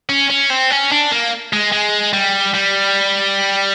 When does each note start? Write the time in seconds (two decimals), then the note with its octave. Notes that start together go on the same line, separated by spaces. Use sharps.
0.10 C#4
0.30 C#4
0.50 C4
0.71 C#4
0.92 D4
1.12 A#3
1.53 G#3
1.72 G#3
2.13 G3
2.54 G3